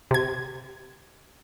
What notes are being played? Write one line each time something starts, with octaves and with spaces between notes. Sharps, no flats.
C3 G#6